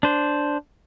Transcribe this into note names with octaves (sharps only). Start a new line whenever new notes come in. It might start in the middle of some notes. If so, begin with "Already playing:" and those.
D4 C5